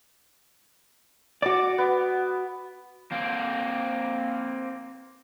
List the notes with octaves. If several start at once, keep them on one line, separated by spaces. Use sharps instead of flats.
F#4 D5 D6
B3
A#3 C4